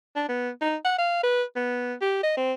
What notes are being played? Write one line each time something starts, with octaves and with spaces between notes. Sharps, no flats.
D4
B3
D#4
F#5
F5
B4
B3
G4
D#5
C4